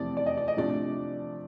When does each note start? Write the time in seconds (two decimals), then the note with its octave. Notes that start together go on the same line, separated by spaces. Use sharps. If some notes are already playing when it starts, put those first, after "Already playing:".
Already playing: F2 C3 E3 A3 C4 D5
0.17 D5
0.26 D#5
0.37 D5
0.48 D#5
0.57 C3 F3 A3 D4 D5